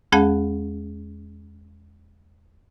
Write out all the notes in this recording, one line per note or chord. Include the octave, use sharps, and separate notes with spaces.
E2 G#3 C#4 G#4 F#5 A5